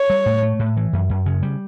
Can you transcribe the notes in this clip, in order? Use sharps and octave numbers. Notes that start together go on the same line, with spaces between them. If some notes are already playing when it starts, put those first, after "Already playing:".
Already playing: C#5
G3
A2
A3
A2
E3
F#2
F#2
C#3
G3